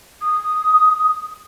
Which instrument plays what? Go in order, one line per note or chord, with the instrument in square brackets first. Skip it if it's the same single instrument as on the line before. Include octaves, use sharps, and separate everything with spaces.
[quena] D#6